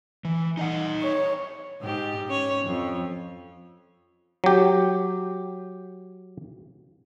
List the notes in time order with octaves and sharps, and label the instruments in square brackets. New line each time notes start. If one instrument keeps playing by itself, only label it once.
[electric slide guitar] E3
D#4 D#5 F#5
[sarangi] C#5
[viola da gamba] G#2 G4
C#4 C#5
F2
[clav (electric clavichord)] F#3 G4